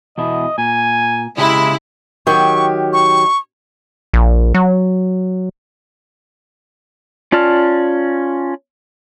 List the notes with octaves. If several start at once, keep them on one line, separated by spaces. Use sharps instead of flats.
E2 B2 E4 D#5
A#2 G#5
C#3 G#3 E4 G4 E5
D#3 F#3 G4 C#6
C#6
A#1
F#3
C#4 F4 D5 A5 F6